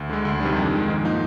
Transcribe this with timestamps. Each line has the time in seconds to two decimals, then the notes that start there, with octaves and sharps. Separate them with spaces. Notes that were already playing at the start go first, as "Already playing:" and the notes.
Already playing: D2
0.10 D3 G#3
0.25 D2
0.40 C3 D#3 G3 D4
0.57 F2
0.72 D#3 G#3
0.88 G#2
1.04 F3 A#3 D#4